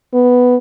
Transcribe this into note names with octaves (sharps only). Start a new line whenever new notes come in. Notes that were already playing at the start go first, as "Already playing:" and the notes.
B3